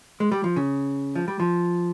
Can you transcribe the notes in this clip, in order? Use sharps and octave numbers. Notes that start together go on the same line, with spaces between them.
G#3
G3
F3
C#3
F3
G3
F3